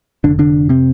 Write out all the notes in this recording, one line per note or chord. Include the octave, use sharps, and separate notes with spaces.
F1 D#2 D3 D4
D3 D4
C3 C4